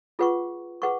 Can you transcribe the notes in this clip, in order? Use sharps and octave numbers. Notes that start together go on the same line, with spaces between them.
F4 G#4 B4 F#5 C#6
G#4 B4 F#5 C#6